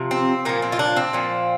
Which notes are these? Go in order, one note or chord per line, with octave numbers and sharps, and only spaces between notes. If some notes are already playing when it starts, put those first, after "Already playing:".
Already playing: C3 F3
C4
A#2 F3 A#3
C4
F4
D4
C4
A#2 F3